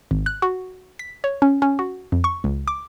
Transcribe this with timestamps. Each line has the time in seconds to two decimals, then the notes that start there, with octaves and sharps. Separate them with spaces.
0.11 G#1
0.26 F#6
0.42 F#4
0.99 B6
1.24 C#5
1.42 C#4
1.62 C#4
1.79 F#4
2.12 F2
2.24 C#6
2.44 C#2
2.68 D6